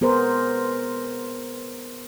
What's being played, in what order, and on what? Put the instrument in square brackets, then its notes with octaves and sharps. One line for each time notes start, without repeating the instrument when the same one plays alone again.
[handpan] B3 G#4 A#4 C5